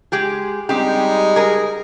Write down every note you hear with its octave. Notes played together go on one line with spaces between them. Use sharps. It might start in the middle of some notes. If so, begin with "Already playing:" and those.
G#3 G4 G#4
G3 G#3 C4 D#4 G4
G#4 A#4